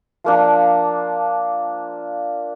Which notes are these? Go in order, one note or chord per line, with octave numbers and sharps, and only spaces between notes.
F3 A#3 D4